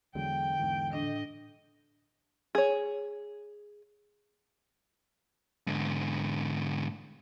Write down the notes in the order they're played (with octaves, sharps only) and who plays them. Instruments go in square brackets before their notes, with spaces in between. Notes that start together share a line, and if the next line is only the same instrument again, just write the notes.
[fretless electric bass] E2 F#3 G#3 [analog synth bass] D3 [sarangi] G5
[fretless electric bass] E2 G#2 E3
[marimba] A2 D4 [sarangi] D#5
[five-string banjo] G#4 C#5
[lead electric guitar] G#2 D3